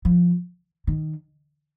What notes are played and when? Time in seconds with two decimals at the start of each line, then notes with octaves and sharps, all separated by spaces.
0.05 F3
0.87 D#3